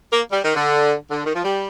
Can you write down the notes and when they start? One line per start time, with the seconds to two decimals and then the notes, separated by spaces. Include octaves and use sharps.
0.11 A#3
0.29 G3
0.42 D#3
0.54 D3
1.09 D3
1.24 D#3
1.33 F3
1.43 G3